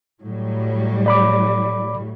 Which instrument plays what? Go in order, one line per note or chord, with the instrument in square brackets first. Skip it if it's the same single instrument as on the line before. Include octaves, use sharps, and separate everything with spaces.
[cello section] A2 F#3 G3
[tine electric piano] D5 B5 D6